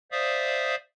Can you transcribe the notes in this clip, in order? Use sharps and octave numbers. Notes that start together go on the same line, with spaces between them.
C5 D5 E5 F5 D#6